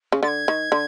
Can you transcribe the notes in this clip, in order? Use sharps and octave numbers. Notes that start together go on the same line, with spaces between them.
C#3
D3 A6
G#6
D#3
D3